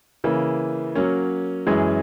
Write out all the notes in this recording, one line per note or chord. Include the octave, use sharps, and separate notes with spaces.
C#3 E3 A#3
F#3 A#3 C#4
F#2 E3 G#3 C#4 G#4